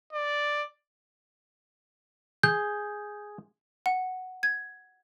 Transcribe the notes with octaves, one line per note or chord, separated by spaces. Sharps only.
D5
G#4 G6
F#5
G#6